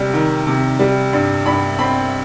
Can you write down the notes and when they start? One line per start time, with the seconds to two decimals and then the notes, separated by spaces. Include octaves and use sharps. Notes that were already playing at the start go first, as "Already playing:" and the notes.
Already playing: C3 G3
0.14 D#3
0.47 C3
0.79 G3
1.13 G2
1.46 G2 B5
1.79 C4 B5